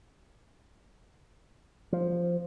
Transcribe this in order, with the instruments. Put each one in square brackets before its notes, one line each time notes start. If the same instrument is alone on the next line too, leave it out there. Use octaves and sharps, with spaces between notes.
[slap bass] F3